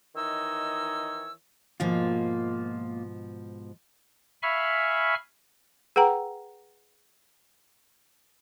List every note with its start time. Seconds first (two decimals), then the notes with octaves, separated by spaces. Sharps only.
0.16 D#3 E3 D#4 C#5 D#5 E6
1.80 G#2 B2 F3 A#3 F4
4.43 E5 F5 G#5 B5 C#6 F6
5.96 G#4 B4 F#5 G5 A#5